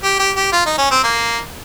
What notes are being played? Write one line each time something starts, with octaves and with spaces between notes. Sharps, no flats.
G4
G4
G4
F4
D#4
C#4
C4
A#3